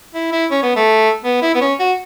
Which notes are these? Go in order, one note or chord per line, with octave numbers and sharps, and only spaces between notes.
E4
E4
C#4
B3
A3
B3
E4
B3
C#4
F#4